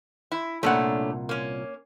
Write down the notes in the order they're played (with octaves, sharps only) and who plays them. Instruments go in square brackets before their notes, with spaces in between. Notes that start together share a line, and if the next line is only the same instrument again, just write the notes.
[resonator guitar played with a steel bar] E4
[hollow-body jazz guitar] C2 A#2 F#5 [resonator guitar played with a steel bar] A3 C#4 D4
[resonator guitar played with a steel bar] A#3 C#4